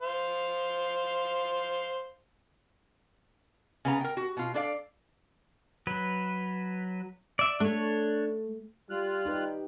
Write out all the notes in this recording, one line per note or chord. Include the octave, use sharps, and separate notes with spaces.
C5 F5
C#3 B3 A#5
A#4 G5
F#4
B2 F4
D4 A4 D5 F5
F#3 B4
D5 E5
A3 D4 C#5
G3 F4 F6 F#6
D#4 G4 B4